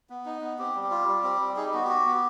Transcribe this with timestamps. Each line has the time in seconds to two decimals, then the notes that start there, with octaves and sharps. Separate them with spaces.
0.10 B3
0.26 D#4
0.42 B3
0.59 C4 G4
0.75 G3
0.83 G4
0.91 F4
1.08 G3
1.23 C4
1.41 G3
1.56 D#4 G#4
1.66 G4
1.74 B3 F#4
1.84 G4
1.89 F#4
2.06 B3